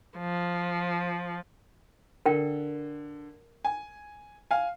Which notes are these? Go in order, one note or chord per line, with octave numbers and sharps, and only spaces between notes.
F3
D3 A#4 G5
G#5
F5 G#5